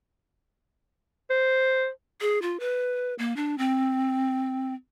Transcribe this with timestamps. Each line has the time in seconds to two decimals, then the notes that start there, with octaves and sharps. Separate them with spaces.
1.30 C5
2.21 G#4
2.42 F4
2.60 B4
3.19 A#3
3.36 D4
3.58 C4